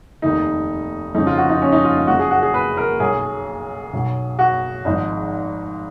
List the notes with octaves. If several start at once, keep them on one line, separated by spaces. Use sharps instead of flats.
F1 D#2 D#3 D#4
F2 C#3 F3 D#4
F4
F#4
D#4
C#4
D#4
F4
F4
F#1 F#2 F3 F#4
G#4
F#4
G#4
B4
A#4
B1 B2 F#3 G#4
B1 B2 F#3
F#4
G#1 G#2 F3 D#4